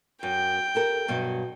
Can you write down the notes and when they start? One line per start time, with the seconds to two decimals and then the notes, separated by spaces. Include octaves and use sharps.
0.23 F#2 G5
0.75 G4 A4 A#4
1.08 G2 B2 F#3